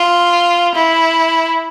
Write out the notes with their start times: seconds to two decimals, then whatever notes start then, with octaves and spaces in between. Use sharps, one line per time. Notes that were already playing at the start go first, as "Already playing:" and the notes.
Already playing: F4
0.75 E4